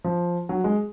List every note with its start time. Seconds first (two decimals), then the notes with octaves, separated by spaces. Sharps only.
0.04 F3
0.49 F#3
0.64 G#3